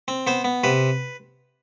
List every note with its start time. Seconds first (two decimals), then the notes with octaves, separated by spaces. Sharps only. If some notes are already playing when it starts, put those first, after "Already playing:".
0.08 C4
0.27 B3 C5
0.44 B3
0.64 C3 B4